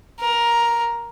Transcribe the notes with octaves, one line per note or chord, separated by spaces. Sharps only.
A#4